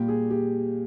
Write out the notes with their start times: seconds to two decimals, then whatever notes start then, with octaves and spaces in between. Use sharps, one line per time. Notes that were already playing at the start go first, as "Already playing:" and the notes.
Already playing: A#2 G3 G4
0.08 G#4
0.30 G4